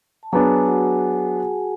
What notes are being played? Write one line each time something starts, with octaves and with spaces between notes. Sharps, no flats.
A5
F#3 B3 D4 G#4 G#5
F#4 F#5